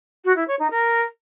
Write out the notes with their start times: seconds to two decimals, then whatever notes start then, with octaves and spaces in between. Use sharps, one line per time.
0.24 F#4
0.36 E4
0.47 C#5
0.59 D#4
0.70 A#4